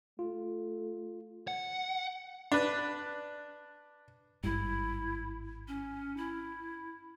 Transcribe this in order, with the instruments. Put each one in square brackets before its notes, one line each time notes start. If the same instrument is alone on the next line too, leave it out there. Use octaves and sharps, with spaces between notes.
[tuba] A3 [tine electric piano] F4
[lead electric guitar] F#5
[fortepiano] D4 B4
[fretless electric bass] G#1 G2 [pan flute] E4
[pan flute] C#4
E4